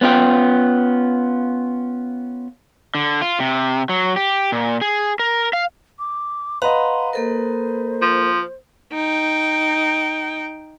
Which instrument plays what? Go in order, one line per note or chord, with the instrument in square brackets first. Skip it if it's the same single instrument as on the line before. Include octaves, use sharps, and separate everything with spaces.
[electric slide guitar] B3 C#4 F4 G4 G5
D3
F4
C3
F#3
G4
A#2
G#4
A#4
F5
[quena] D6
[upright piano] B4 D#5 [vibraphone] F5 F#5 A#5 [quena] C6
[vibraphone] A#3 A4 A#4 [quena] C5
[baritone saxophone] F3
[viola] D#4 G5